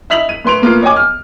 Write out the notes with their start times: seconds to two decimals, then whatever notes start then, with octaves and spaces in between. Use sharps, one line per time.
0.10 E4 D#5 E6 B6 F7 F#7
0.29 D#7
0.45 A2 B4 C6 D7 F7
0.62 A2 A#3 B3 F4
0.82 C#5 D#5 G5 G#5 D6
0.96 F6